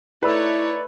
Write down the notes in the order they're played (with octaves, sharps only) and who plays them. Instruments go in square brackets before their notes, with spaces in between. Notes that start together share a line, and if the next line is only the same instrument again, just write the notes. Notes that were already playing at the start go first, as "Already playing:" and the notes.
[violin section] A3 D#4 C#5 [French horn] E4 [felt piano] B4 B5 E6 [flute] D5